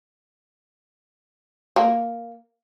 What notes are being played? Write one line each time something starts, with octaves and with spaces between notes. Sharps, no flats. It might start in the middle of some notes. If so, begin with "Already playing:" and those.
A#3